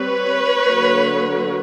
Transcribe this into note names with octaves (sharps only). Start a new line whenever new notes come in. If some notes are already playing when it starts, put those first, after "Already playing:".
Already playing: G3 C4 B4 C#5
D3 F#3 A#3